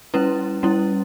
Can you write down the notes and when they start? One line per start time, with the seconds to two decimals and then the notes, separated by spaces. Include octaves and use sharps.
0.14 G3 C#4 E4 B4
0.63 G3 C#4 E4